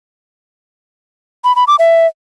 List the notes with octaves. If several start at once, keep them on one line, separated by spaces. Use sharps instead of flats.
B5
B5
D6
E5